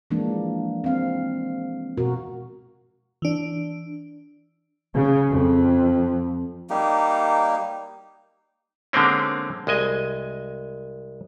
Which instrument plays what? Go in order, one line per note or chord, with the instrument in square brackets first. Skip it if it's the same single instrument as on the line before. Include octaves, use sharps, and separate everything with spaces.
[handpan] E3 F3 G#3 A#3 D4
C4 F5
B2 F#4 A#4
[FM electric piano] E3 D4
[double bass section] C#3
F2
[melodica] G3 A#3 D#4 G4
[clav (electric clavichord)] D3 G#3 A#3 C4 C#4
C2 G#3 D#5 G#5